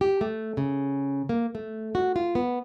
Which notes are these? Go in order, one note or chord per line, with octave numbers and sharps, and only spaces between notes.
G4
A3
C#3
A#3
A3
F#4
F4
B3